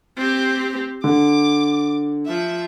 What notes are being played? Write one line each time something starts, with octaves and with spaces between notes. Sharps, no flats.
C4 G4
D3 D6
F3 E5